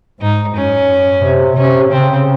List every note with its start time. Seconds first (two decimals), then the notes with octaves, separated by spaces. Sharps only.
0.20 G#2 D#4
0.55 F#2 C#4
1.23 C3
1.57 C3 C#4
1.91 C#3 C4